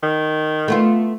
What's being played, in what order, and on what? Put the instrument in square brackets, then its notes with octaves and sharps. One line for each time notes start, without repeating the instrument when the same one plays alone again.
[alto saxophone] D#3
[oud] A3 B3 F4